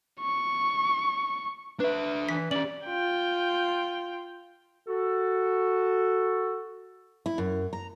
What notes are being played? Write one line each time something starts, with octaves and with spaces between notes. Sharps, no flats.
C#6
D4 B4 E5
E3 B6
C#4 G4 D5 F#7
F4 G5
F#4 A4
E4
F#2
A#5